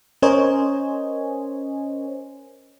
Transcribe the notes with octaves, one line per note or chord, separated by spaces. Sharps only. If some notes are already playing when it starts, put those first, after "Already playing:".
C#4 A#4 C5 C#5 D#5 G#5